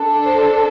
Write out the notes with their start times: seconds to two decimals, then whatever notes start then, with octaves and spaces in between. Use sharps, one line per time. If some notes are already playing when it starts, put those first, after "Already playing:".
Already playing: D4 A4
0.25 C5